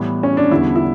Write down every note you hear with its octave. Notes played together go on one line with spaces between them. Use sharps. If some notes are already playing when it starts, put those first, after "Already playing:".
Already playing: A2 E3 G3 B3
C#4
D4
E2 D3 G3 B3 E4
E4